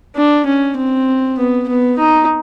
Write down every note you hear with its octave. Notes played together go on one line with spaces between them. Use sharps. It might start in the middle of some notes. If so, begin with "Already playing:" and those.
D4
C#4
C4
B3
B3
D#4